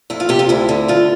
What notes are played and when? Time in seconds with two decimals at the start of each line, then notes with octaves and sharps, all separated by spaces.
0.10 F2 E4
0.20 F4
0.29 C3 G4
0.39 F4
0.49 D2 E4
0.69 D3
0.88 G2 F4